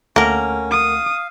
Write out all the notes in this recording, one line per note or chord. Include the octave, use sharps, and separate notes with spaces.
D2 A3 A#3 C#4 A#4 F#5
F5 D#6